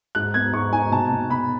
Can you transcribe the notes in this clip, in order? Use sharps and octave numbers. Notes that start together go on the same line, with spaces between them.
G#2 F#6
B3 G#6
G#2 C#6
D#4 G#5
B2 A5
B2
B2 B5